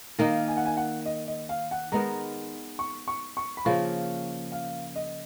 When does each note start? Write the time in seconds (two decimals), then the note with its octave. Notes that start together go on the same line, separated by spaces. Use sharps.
0.19 D#3 A#3 D#4 F5
0.48 G#5
0.57 F#5
0.65 G#5
0.77 F#5
1.06 D#5
1.28 D#5
1.49 F5
1.71 F#5
1.92 G#3 B3 D#4 A#4 A#5
2.79 C#6
3.08 C#6
3.37 C#6
3.57 B5
3.65 C#3 F3 A#3 C#6
4.52 F5
4.96 D#5